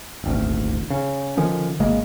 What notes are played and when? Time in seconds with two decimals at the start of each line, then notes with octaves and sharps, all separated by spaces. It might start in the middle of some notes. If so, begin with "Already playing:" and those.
0.24 D#1 G#1 D2
0.90 C#3
1.37 D3 D#3 F3 C#4
1.80 G#1 C#3 G#3 A#3